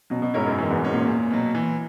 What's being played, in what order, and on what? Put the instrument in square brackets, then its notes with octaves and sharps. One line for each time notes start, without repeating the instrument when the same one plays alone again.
[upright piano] B2 [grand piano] F#3
[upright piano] B2
[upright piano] G#2 [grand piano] C#4 E4 A#4 C#5
[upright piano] F#2
[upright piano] F#2 [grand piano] E3
[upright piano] E2
[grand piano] G#3 C#4
[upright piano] A#2
[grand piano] E2
B2 F#3
E3